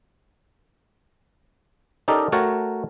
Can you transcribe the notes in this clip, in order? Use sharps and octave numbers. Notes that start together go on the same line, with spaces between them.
C#4 D#4 G4 A4 A#4 D5
A3 F#4 A#4 C#5 G5 A5